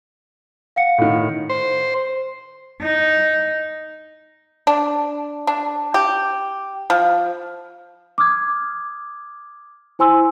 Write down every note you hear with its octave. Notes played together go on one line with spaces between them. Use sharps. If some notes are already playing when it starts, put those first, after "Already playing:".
F5 F#5 C#7
A2 D#3
C5
D#4
D4
D4
G4
F3
D6 D#6 F6 G#6
E4 C5 G#5 C6 E6